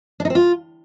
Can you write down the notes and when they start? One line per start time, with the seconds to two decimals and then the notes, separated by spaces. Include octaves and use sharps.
0.20 D4
0.25 D#4
0.30 C4
0.35 F4